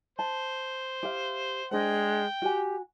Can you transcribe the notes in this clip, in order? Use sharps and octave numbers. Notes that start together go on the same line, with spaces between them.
C5 A5
G4 E5 F5
G#3 D4 C5 G5
F#4 G4 G#5